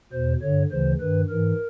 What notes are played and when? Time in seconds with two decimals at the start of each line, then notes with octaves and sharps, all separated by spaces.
0.12 E2 B2 C5
0.42 G2 D3 C#5
0.71 D2 C#3 E3 C5
1.00 G2 D#3 B4
1.29 G#2 E3 A#4